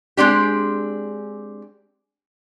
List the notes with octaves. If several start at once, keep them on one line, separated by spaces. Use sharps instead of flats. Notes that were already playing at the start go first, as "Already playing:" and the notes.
G#3 C4 D4 G4